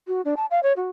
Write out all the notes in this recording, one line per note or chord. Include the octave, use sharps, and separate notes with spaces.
F#4
D4
A5
F5
C#5
F#4